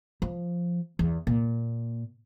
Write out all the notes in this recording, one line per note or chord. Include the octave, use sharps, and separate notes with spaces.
F3
E2
A#2